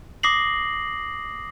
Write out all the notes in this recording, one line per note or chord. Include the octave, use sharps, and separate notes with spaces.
D6 D#6 A#6 C7 F#7